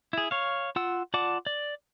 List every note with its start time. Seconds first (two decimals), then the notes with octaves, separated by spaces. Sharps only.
0.13 E4 G#4
0.31 C#5 F5
0.76 F4 F#5 E6
1.14 F4 D5 F#5 A5 D6
1.47 D5